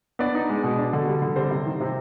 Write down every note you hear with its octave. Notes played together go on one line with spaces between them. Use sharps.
B3 D4 D5
D#4
G#3
B2
D4
D3
G3
D3
G3 C4 C5
C3
D#3
C3